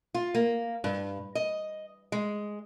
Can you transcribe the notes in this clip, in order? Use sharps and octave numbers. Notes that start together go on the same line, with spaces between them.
F4
A#3
G2
D#5
G#3